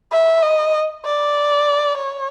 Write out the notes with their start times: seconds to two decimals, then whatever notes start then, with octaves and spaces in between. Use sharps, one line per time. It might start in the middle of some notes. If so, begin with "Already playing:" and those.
0.12 E5
0.42 D#5
1.05 D5
1.98 C#5